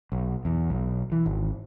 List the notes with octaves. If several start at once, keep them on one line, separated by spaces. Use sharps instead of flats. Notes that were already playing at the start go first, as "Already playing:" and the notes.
B1
E2
B1
E3
G#1